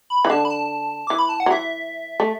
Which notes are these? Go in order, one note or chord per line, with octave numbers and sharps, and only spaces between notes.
B5
E3
D3 A5
B5
A5
E3 D6
B5
A5
F#5
F#3
E3 E5
A3